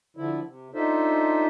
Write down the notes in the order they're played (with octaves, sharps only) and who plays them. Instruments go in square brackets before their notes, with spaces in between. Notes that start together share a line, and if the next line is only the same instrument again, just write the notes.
[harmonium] D3 F3 E4
C3
D4 D#4 F4 A4 C5 E5